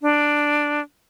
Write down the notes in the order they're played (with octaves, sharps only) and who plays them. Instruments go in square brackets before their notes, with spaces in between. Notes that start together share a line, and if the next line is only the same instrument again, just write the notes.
[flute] D4